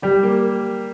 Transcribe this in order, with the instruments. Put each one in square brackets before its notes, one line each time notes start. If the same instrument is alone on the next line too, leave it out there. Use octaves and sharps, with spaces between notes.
[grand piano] G3 [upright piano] G4
[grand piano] A#3